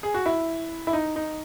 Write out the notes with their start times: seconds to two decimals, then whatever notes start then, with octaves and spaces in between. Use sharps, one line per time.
0.03 G#4
0.14 F#4
0.26 E4
0.87 E4
0.93 D#4
1.16 D#4